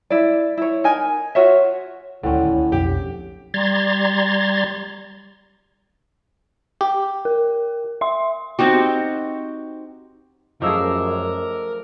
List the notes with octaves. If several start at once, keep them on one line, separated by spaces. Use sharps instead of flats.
E4 D5
E4 C#5
D#4 A#4 G#5
F4 F#4 C#5 E5
D#1 D2 A2 D3 C4 C#4
B1 F2 G4
G3 A#5 C6 G#6 A6
G4
A#4
E5 C6
C4 D#4 F#4 G4
F#2 F3 A3 G#4 A#4 D#5 D6 E6